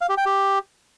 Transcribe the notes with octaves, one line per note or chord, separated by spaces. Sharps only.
F5
G4
G5
G4